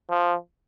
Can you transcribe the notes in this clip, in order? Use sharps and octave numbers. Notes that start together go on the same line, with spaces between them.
F3